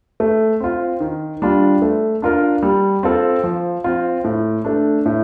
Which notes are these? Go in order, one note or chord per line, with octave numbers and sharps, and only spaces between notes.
A3
C4 F4
D#3
G3 D4 F4
A3
D4 F4 A#4
G3
C4 F4 A4
F3
C4 F4
A2
A3 D4
A2